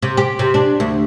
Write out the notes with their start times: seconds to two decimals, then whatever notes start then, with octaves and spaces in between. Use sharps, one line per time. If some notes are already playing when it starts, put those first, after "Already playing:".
0.02 C3
0.17 G4
0.39 C3
0.54 D4
0.80 D2